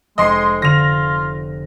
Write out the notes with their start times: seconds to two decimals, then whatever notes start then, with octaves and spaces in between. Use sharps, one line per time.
0.18 F1 G#3 D#5 C6 C7 C#7
0.62 D3 F4 A#6 F7